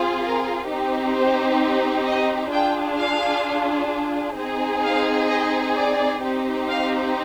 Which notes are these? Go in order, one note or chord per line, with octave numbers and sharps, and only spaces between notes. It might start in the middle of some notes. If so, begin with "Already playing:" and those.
Already playing: C4 F4 G#4
A#4
C4 D#4 G4
C5
D#5
D4 F4 G#4 G5
F5
C4 D#4 G#4
F5
D#5
D5
C4 D#4 G4
F5